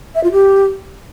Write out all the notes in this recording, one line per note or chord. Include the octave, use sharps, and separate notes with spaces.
E5
F4
G4